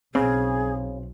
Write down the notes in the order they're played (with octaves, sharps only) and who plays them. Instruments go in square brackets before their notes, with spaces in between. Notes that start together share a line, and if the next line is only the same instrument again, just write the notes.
[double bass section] B1 [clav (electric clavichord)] C#3 [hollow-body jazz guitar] C4 [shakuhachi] G#4